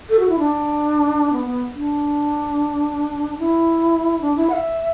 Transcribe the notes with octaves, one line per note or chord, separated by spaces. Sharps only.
A4
F#4
E4
D4
B3
B3
D4
E4
D4
E4
F#5
E5